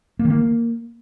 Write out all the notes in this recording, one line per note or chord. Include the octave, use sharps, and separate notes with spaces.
A#3
D#3
A#3